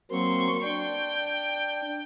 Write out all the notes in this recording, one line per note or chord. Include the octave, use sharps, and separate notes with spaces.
F#3 A#3 C4 C6 C#6
D4 G5